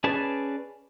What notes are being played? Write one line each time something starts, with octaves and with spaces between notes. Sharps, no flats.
C#4 G#4 B4 D5 A5